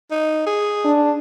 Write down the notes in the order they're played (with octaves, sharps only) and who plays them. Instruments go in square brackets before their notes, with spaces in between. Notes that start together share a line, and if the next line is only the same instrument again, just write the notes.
[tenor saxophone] D#4
G#4
[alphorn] D4